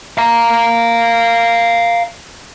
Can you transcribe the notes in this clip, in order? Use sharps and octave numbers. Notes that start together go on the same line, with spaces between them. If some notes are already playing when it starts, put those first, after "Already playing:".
F5 A#5